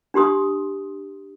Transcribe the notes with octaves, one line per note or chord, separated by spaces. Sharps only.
D4 G4 C6 D#6